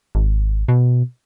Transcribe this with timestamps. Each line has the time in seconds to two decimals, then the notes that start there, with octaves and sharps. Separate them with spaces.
0.15 G#1
0.69 B2